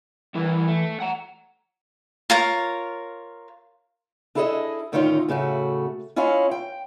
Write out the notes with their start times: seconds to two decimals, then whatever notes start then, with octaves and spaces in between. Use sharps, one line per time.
0.35 E3 G3 E4 A#4
0.67 A3
1.00 F#5 A#5
2.30 F4 A#4 C#5
4.35 D4 E4 G#4 A4 D5 D#5
4.92 A2 D3 D#3 C#4 D#4 F4
5.28 A2 C#3 A3 F#4
6.16 C#4 E4 F4 C#5 D#5 F5
6.51 G5